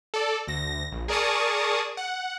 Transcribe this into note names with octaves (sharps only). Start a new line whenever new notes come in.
A4 D5
D2 A#6
A#1
G#4 A#4 D5 A5 C#6 D#6
F#5